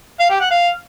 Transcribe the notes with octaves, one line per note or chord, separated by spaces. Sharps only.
F5
G4
F#5
F5